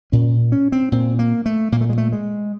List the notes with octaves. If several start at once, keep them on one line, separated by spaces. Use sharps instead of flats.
A#2 C#4
C#4
C4
A#2 C4
A#3
A3
A#2 A#3
A3
G#3
A3
G#3